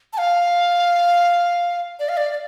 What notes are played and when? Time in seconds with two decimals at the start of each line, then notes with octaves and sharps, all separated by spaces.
0.13 A5
0.18 F5
1.99 D5
2.09 F5
2.17 D5
2.30 D5